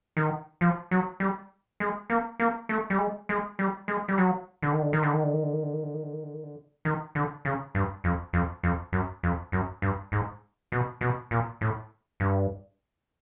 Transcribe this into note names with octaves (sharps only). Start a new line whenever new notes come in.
D#3
F3
F#3
G3
G#3
A#3
A#3
A3
G3
G#3
G#3
G3
G#3
G3
F#3
D3
D#3
D3
D#3
D3
D#3
D3
D#3
D3
D#3
D3
D#3
D3
D#3
D3
D#3
D3
D#3
D3
D#3
D3
C#3
G2
F2
F2
F2
F#2
F2
F#2
G2
G#2
B2
B2
A#2
A2
G2